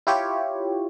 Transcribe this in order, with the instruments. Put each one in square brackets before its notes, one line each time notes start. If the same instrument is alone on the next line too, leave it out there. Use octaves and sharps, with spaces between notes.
[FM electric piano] E4 F4 G4 C#5